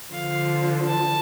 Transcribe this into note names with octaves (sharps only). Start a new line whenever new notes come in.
D3 F3 F5
A5